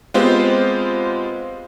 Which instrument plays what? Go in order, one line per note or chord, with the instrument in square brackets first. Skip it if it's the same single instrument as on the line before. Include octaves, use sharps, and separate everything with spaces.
[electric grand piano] G#3 B3 C4 F4 G4 C5